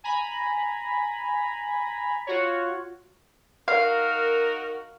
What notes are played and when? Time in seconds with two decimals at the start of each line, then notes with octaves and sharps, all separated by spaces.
0.04 G#5 A#5 B5
2.27 F4 F#4 C#5
3.68 D#4 F#4 A#4 F5